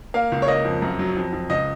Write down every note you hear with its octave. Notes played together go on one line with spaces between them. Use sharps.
A#3 F5
C#2
C#5
A#3 D#5
F2
F#2
F#3
F2
F2
C#2 D#5